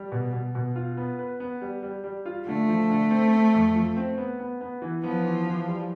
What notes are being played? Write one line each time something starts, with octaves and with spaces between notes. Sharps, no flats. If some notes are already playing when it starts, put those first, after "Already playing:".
Already playing: G3
B2
B2
B2
F4
B3
B4
B3
G3
G3
G3
F4
D3 A3
F3
D3
C4
C4
F2
F3
C4
B3
B3
B3
E3
F3 B3
E3
E3
G3